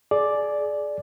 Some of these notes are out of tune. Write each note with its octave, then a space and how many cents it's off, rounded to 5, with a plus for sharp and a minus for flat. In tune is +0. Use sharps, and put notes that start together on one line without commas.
G#4 +30 D5 +0